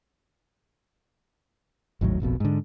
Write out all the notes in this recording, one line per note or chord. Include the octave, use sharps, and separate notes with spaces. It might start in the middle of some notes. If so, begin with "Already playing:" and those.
G#1 D#2 A2 F#3
F1 A#1 F2 B2
G#2 D3